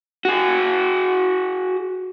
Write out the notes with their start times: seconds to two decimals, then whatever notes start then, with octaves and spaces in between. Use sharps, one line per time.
0.25 F#4 G#4